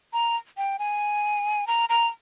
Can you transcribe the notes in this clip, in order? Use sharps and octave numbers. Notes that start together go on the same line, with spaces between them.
A#5
G5
G#5
A#5
A#5